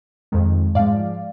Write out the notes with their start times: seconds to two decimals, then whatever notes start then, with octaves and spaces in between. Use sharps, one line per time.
0.32 F2 D#3 G#3
0.75 G#2 F3 G#3 D5 F5